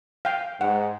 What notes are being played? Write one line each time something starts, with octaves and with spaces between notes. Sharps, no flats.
F5 G5
G#2 F#5